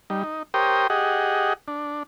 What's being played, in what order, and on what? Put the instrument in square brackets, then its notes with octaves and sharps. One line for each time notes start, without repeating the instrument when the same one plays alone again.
[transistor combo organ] G3 D#4
D#4
G4 A#4 C5 C#5 G5 D#6
G4 G#4 D#5 F#5
D4